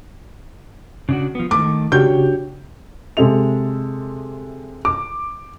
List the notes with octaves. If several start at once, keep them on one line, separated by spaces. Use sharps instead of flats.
C#3 D4 F#4
F3 B3
D#3 A3 D6
C#3 D4 F#4 G4 C#5 G5 G6
C3 G#3 A4 E5 F7
D6